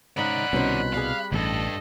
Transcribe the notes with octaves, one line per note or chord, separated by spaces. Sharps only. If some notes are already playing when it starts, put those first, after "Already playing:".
G#2 C#3 D#4 D5 F#5 B5 F#6
C2 B2 C#4 D#4 C5
G3 C4 G#4 F5
A1 D2 G2 A4 D#5